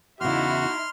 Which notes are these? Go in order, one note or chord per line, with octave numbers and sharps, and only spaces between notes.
E2 C#3 D#4 E4 F#4 E5 C6 F6